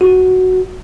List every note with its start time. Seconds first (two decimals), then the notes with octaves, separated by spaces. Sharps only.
0.01 F#4